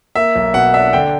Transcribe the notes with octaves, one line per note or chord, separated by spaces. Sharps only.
A#3 E5
B1
B2 F#5
D4 E5
D3 G5